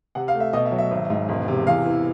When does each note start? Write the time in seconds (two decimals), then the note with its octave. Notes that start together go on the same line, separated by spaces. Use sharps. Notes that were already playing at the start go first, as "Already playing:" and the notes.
0.15 C3 F#5
0.28 F5
0.34 A3
0.40 E5
0.53 B2 D#5
0.65 E5
0.72 F#3
0.78 E5
0.91 G#1
1.10 G#2
1.29 E1
1.48 C3
1.67 E2 F5
1.86 E3